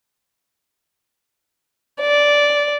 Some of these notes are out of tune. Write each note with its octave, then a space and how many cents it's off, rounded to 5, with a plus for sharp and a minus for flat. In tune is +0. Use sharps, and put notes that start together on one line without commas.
D5 -5